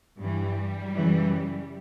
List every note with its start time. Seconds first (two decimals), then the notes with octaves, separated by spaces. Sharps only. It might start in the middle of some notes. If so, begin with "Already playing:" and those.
0.17 G2 E3 G3
0.94 F#2 C#3 E3